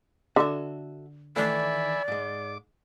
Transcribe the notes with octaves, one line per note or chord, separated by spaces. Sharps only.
D3 F#4 A4 E5
D#3 E3 A3 D5 E5 G#5 B5
G#2 G#3 D6